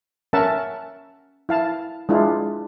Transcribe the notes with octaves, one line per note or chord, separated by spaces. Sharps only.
C#4 A#4 E5 F#5 A5
E4 F5 A5
G#3 D4 E4 F4